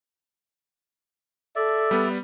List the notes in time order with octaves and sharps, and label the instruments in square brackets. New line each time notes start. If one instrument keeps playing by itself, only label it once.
[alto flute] A4 [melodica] D5 E5
[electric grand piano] G3 B3